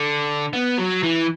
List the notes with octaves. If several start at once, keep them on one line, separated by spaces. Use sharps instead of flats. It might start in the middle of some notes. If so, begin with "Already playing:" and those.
Already playing: D3
B3
F#3
E3